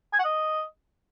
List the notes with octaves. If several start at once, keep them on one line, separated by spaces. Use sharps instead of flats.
G#5
F#5
D#5